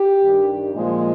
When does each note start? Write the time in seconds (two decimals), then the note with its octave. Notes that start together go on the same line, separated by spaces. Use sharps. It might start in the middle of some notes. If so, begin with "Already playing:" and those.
Already playing: G4
0.24 G2 D#3 G3
0.74 A#2 F3 G#3